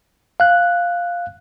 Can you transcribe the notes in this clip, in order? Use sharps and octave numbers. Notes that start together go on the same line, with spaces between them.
F5 F#6